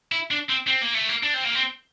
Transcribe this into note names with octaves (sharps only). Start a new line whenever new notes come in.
E4
D4
C4
C4
A#3
A3
A#3
D4
C4
A#3
C4